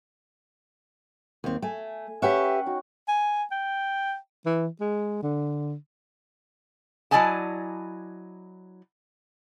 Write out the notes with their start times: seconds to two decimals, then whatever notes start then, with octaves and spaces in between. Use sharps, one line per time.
1.44 D#2 C4
1.62 A3 G#5
2.22 C#4 G4 B4 E5 F#5 G5
2.66 D#4 F#4
3.09 G#5
3.52 G5
4.46 E3
4.81 G#3
5.23 D3
7.11 F#3 E4 D5 D#5 G#5 A5